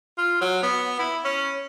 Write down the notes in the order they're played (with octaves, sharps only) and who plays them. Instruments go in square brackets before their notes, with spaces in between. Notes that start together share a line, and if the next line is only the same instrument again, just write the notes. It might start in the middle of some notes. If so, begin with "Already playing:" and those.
[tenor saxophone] F4
F#3
B3
E4
C#4